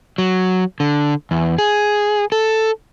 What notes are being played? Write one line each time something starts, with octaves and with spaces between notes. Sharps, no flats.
F#3
D3
E2
G#4
A4